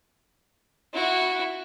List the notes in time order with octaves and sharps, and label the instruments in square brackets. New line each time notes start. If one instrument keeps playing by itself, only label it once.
[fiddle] E4 F#4